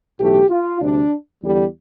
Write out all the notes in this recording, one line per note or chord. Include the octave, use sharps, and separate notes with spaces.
B1 A2 E3 A3 G4
F4
D2 C3 G3 D4
E2 D3 G3